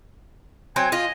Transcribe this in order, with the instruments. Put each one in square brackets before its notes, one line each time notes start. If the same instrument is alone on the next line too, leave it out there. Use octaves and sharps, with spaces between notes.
[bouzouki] F#3 C4 G5 [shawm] G#5
[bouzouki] F4 [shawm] D#5